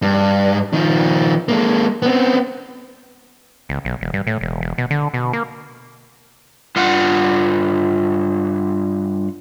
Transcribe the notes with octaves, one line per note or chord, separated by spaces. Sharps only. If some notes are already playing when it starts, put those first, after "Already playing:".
G2
D#3 F3
G#3 A#3
B3 C4
C#2
B1
E1
G2
A2
E1
E1
B2
D3
B2
A#3
G2 F4 F#5